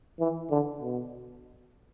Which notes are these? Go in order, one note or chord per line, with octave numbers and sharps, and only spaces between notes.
E3
D3
B2